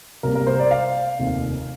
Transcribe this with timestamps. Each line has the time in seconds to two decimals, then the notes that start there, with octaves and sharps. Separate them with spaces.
0.23 C2 C3 G3 A#3 A#4
0.35 A#4
0.47 C5
0.59 D5
0.71 F5
1.19 F1 D#2 D#3